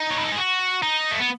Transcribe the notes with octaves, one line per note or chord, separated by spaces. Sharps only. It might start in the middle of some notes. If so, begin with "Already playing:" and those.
Already playing: D#4
C#5
B4
A4
G#4
F#4
D#4
A3
B3